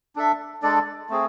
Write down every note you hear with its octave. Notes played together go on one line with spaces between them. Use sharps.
D4 A4 E5
G#3 D4 A4 D5
A3 C4 G#4